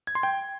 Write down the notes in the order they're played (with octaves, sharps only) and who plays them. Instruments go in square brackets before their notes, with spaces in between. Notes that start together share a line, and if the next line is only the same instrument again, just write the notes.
[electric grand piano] G#6
C6
G5